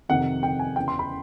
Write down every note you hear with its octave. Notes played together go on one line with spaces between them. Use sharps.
F2 C3 D#3 F#5
F2 C3 D#3 G5
G#5
E2 C#3 E3 G5
C6
B5